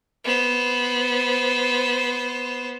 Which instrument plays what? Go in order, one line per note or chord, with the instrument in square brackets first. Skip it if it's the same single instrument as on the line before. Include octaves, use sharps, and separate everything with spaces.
[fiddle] B3 C5